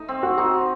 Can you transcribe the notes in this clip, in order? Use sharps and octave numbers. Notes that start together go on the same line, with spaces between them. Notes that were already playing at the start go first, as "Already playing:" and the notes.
Already playing: A3 D#4
C4
F#4
D#4 F#4